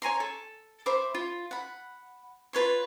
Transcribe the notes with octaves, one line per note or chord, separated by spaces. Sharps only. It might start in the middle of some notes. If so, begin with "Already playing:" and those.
C#5 G#5 A#5 C6
A4
C5 E5 B5 D6
F4
F#5 B5
F4 B4 C#5 C6